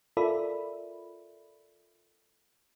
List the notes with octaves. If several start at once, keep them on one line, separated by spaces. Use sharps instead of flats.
F4 A4 A#4 D5 E5 B5